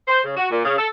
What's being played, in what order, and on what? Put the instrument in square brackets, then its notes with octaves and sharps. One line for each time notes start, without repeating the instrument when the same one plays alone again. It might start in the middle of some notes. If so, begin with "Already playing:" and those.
[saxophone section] C5
C#3
F#4
A#2
C#3
A4